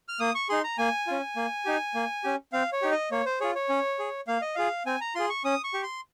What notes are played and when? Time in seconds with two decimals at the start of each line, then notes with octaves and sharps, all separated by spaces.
0.08 F6
0.20 A#3 D#6
0.35 C#6
0.49 D#4 G#4 C6
0.64 A#5
0.78 A#3 G#5
1.07 C#4 F4
1.36 A#3
1.65 D#4 G4
1.95 A#3
2.24 C#4 G4
2.53 C4 F5
2.72 C#5
2.82 D#4 G4
2.92 D#5
3.11 A#3 C#5
3.26 C5
3.40 F4 G#4 C#5
3.55 C#5
3.69 C#4
3.99 G#4
4.28 A#3 F5
4.42 D#5
4.55 F4 G#4 F5
4.86 C4 G#5
5.01 A#5
5.15 F4 G#4 C6
5.30 C#6
5.44 C#4 D#6
5.64 C#6
5.74 G4
5.83 C6